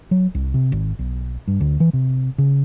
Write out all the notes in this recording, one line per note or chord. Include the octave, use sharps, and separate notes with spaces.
F#3
C2
C3
G#1
B1
G2
D2
E3
C3
C#3